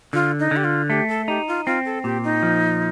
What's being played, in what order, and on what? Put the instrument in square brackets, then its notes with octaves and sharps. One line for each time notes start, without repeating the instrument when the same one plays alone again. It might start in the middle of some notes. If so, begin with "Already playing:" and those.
[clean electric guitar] D3 [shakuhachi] F4
[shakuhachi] D#4
[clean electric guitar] D3
[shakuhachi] G4
F4
[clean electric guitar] A3 [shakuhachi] G4
[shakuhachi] A4
[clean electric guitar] D#4 [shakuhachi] G4
[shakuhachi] F4
[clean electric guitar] C4 [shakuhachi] F4
[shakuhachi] A4
[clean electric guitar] A#2 [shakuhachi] G4
[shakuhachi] D#4
[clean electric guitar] F3